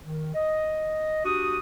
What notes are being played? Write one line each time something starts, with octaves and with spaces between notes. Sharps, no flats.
D#3
D#5
D4 F#4 G4 D#6